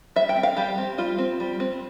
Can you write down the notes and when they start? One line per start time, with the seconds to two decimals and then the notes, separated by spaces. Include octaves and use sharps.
0.16 G3 E5
0.29 G5
0.36 C4
0.43 F5
0.57 G3 G4
0.78 C4
0.98 G3 F4
1.18 C4
1.40 G3
1.60 C4